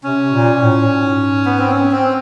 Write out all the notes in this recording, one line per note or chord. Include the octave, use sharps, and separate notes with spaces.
C3 C#4
A#2
A2
G#2
B3
C4
C#4
C4